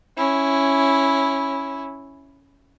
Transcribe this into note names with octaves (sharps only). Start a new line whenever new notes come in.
C#4 E4